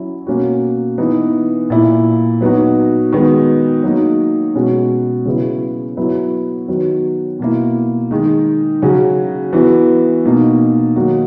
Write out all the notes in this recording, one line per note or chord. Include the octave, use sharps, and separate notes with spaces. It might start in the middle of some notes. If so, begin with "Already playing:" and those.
Already playing: F#3 C#4 E4
B2 A#3 C#4 F#4
E3 B3 D#4
A#2 A#3 E4
F#3 B3 D#4 F#4
D#3 G#3 B3 D#4 F#4
F#3 A#3 D#4
B2 G#3 C#4 F#4
C#3 F#3 B3 E4
F#3 B3 E4
D#3 F#3 B3 F#4
B2 A#3 E4
D#3 G#3 D#4
C#3 F#3 C#4 F#4
E3 B3 F#4
B2 A#3 D#4
D#3 F#3 A#3 D#4 F#4